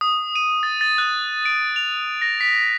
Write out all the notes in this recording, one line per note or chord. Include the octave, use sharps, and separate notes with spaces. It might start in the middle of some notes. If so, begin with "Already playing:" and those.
D#6
D#7
A6
A6
F#6
D7
F7
A#6
B6